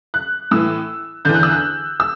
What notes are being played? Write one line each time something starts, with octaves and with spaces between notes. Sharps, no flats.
F#6
A2 E3 E6
E2 D3 G6
F#6
E6
F#6
E6